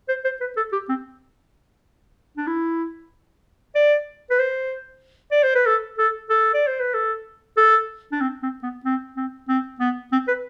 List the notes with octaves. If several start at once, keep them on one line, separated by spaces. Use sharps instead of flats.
C5
C5
B4
A4
G4
C4
D4
E4
D5
B4
C5
D5
C5
B4
A4
A4
A4
D5
C5
B4
A4
A4
D4
C4
C4
B3
C4
C4
C4
B3
C4
B4